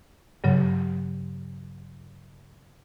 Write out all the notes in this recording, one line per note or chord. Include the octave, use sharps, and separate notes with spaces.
G2 C#3 F#3